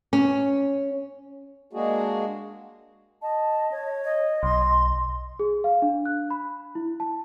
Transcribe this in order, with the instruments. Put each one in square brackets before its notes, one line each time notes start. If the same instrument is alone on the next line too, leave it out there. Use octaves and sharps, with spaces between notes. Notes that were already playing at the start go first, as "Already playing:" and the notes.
[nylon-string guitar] C#4
[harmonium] G#3 A#3 D4 F#4 G#4
[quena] D#5 [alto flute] A5
[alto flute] C#5
[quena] D#5
[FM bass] B1 [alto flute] C6
[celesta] G#4
F5
D4
F#6
B5
E4
A5